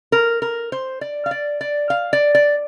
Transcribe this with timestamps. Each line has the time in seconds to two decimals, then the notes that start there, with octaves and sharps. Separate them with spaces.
0.12 A#4
0.42 A#4
0.72 C5
1.01 D5
1.26 F5
1.31 D5
1.61 D5
1.90 F5
2.13 D5
2.35 D5